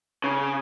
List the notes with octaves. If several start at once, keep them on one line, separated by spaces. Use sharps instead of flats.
C#3